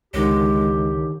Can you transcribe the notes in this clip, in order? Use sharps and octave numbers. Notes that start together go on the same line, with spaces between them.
C#2 D3 D#3 G#3 G4 C#5